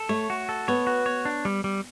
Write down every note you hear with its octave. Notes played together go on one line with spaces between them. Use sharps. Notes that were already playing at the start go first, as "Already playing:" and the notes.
Already playing: A4
A3 C#5
F#4
A4
B3 C#5
F#4
C#5
D4
G3
G3